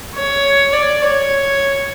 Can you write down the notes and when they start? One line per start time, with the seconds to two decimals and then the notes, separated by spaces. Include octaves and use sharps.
0.16 C#5
0.73 D5
1.02 C#5